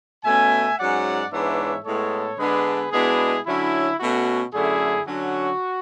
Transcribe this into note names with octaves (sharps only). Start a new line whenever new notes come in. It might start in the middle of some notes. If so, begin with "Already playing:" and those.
B2 A3 C#4 E5 G#5
G#2 F#3 C#4 D5 F#5
G#2 E3 B3 D4 C#5 E5
A2 G#3 B3 A4 C#5
D3 G#3 B3 D4 G#4 B4
B2 G#3 B3 D4 E4 G#4
D3 F#3 C#4 E4
B2 A3 C#4 F#4
F#2 D3 A3 E4 G#4
D3 F#3 C#4 F#4